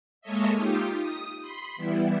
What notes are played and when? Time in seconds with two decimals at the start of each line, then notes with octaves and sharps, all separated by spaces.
0.21 G#3 A#3 A4 C#5 D#5 E5
0.55 D#4 F4 G4
0.96 D#6
1.41 B5 C6
1.76 E3 G3 B3 E4